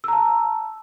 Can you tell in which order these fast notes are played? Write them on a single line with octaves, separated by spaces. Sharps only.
E6 A#5 A5